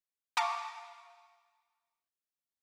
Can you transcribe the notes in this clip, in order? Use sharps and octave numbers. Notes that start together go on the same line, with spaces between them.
F5 A5 A#5 C#6 D6